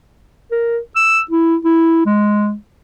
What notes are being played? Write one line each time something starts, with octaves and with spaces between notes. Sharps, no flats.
A#4
E6
E4
E4
G#3